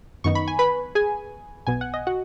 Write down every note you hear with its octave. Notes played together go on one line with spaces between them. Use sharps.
F#2 D#3 B3 D#4 C#6
B5
G#5
B4 B5
G#4 G#5
B1 B2 B3 G#5
F#5
D#5
F#4 F#5